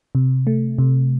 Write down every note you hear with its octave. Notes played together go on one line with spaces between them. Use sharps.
C3
A3
C3